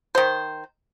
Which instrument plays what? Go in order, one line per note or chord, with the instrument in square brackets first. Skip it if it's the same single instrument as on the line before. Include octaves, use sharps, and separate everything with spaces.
[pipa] D#3 C5